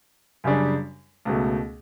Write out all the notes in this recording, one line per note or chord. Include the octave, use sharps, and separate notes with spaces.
F#2 C#3 G3 D4
C#2 B2 A3